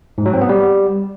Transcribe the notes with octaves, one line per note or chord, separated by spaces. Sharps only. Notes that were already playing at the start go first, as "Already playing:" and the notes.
G#2
F#3
C4
B3
G3